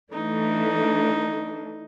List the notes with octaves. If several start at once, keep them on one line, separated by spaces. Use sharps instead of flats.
E3 A3 D4 D#4